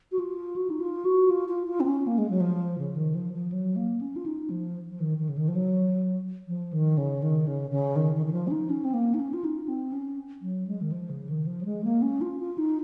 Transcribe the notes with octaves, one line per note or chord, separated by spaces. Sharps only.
F#4
F4
F#4
D#4
F4
F#4
F4
F4
F4
C4
C#4
A#3
G#3
F#3
F3
C#3
D#3
F3
F3
F#3
A#3
C#4
F4
D#4
F3
F3
D#3
D#3
C#3
D#3
F3
F#3
F3
D#3
C#3
D#3
C#3
C#3
D#3
D#3
D#3
F3
C#4
D#4
C#4
C4
A#3
D#4
C#4
F4
D#4
C4
C#4
F#3
G#3
D#3
F3
C#3
D#3
F3
F#3
G#3
A#3
C#4
F4
F4
D#4